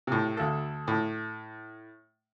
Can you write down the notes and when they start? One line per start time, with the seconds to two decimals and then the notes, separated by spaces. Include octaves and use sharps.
0.07 A2 C3
0.37 D2 A4
0.88 A2